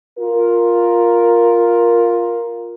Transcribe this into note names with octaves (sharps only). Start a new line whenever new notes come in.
F4 A#4